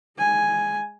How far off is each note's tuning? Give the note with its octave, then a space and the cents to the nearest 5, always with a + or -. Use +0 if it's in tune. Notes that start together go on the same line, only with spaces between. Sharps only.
G#3 -10 G#5 +0